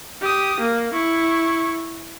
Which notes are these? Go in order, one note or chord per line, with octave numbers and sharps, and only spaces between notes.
G4 D#6
A#3
E4 C#6